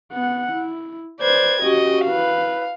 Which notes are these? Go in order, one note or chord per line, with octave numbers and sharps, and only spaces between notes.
B3 F#5
E4
B4 C5 D5 G#6
C#4 F#4 G4 D#5
E4 B4 F5